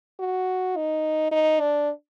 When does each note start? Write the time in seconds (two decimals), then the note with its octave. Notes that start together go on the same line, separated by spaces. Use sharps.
0.20 F#4
0.76 D#4
1.32 D#4
1.60 D4